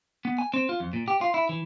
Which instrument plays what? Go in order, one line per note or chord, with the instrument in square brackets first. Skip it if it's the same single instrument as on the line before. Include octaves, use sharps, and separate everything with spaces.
[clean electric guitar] B3
G#5
C4
F4
F2
A#2
G4
F4
E4
E3